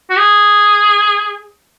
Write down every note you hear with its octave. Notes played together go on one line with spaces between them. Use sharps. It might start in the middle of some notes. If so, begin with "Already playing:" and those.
F#4
G#4